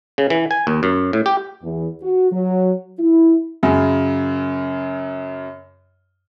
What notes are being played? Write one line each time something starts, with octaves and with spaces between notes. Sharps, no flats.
C#3
E3
G#5
D#2
F#2
A2
G4
E2
F#4
F#3
E4
F#2 C#3